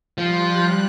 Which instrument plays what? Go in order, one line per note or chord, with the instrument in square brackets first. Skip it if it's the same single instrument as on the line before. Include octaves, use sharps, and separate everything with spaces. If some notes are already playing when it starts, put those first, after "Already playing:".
[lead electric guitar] F3 [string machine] G3 F#6